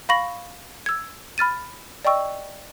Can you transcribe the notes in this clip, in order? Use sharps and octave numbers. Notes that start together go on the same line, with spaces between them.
F5 B5 C#6 A#6 F#7
E6 G#6
B5 F6 A6 D#7
D5 D#5 G5 C#6 E6